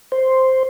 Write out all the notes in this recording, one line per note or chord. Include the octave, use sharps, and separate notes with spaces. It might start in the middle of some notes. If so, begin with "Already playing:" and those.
C5